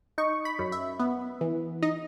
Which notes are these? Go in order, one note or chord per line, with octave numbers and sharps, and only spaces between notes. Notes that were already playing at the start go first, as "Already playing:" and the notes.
D#4 C#6
B5
F#2
E5
B3
E3
D#4 D#5